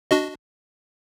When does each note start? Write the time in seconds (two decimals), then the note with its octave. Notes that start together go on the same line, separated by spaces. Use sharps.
0.11 D4 F#4 D#5